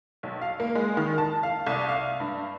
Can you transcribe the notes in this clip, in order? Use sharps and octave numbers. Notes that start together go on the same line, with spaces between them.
B1
F5
A#3
G#3
D#3
A5
F5
C2
F5
G2